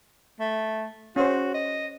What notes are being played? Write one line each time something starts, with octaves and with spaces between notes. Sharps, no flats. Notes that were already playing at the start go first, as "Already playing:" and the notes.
A3
C#4 F#4 C5
D#5